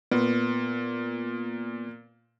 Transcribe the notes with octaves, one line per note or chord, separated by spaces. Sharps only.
A#2 B3